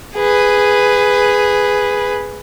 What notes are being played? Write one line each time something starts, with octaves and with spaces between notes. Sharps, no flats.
G#4 B4